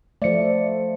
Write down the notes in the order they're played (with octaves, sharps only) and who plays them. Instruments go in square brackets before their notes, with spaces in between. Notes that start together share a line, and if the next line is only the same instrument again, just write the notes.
[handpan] F3 A3 [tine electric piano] D5 C#7